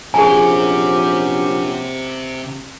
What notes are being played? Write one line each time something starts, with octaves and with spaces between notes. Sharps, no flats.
A#1 C3 F#3 C#4 G4 G#4 G#5